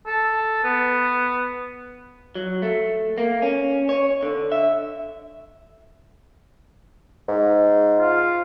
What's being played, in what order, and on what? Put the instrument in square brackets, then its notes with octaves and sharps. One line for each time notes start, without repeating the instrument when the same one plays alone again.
[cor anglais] A4
B3
[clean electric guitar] F#3
A3
A#3
C#4
C#5
D3
E5
[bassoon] G#2
[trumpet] F4